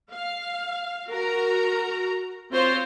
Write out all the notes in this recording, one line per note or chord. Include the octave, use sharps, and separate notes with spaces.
F5
F#4 A#4 A#5
C4 F4 C5 C#5